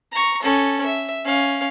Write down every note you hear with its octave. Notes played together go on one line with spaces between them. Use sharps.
A#5 C#6
C#4 A4
E5
C#4 F5